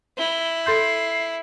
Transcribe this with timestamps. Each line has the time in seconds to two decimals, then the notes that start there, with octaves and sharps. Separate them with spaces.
0.18 E4 G7
0.66 A4 C6 G6 C7